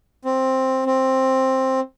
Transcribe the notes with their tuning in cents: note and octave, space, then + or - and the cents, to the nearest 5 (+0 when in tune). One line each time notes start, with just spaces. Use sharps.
C4 +5
C4 +10